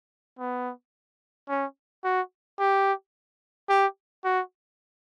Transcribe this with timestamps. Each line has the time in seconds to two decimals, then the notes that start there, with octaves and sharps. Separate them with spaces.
0.39 B3
1.49 C#4
2.04 F#4
2.60 G4
3.70 G4
4.25 F#4